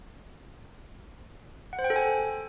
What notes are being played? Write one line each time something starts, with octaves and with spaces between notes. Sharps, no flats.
F#5
C5
G5
A4
G#5